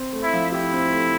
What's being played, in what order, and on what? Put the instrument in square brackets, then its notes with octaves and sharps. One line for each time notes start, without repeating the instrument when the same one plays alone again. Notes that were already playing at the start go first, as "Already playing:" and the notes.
Already playing: [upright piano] C4
A3
[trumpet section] E4
[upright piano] F3
[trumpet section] E4 [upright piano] G4
[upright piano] C4
A3